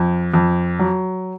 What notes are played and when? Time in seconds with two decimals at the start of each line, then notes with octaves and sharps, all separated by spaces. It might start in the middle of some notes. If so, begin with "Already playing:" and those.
Already playing: F2
0.34 F2
0.79 F#3